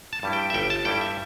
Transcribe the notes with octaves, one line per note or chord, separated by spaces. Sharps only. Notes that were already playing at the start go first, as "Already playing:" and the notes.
A5
G2 G3 E4
G5
E5
G1 G5
A5
G2 G3 E4 G5
E5